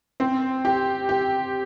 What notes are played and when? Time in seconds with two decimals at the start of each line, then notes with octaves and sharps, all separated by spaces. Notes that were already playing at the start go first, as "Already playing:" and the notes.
0.20 C4
0.65 G4
1.09 G4